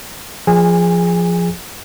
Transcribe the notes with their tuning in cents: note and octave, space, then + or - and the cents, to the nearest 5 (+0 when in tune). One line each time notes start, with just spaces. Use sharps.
F3 +0 G#4 +0 G#5 -25